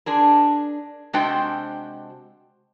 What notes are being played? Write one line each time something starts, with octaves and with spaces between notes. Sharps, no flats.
D4 G#4 A#4
C3 G#3 D4 F#4 C5 G5